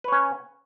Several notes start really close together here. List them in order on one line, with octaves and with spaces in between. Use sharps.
B4 C#5 C#4